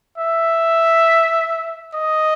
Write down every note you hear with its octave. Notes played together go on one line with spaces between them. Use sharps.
E5
D#5